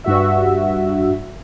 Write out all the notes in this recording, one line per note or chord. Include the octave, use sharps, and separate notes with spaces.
G2 F#4 E5